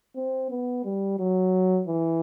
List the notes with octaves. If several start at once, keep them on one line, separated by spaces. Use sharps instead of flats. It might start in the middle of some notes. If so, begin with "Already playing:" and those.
C4
B3
G3
F#3
E3